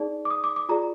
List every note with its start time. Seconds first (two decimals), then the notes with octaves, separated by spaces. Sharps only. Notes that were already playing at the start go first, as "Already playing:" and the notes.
Already playing: D#4 G#4 D5
0.25 D6
0.30 D#6
0.44 D6
0.56 D6
0.69 F4 G#4 D5 A#5